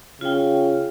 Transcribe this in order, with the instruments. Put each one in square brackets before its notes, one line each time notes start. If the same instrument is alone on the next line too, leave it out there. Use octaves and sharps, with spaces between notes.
[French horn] C#3 [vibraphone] F4 G5